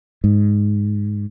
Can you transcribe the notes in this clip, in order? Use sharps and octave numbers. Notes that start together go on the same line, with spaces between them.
G#2